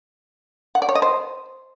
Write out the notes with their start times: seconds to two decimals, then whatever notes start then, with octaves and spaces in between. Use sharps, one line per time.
0.75 F#5
0.82 D5
0.89 C#5
0.95 D#5
1.02 C5